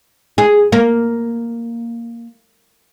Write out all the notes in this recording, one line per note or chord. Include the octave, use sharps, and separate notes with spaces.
G#4
A#3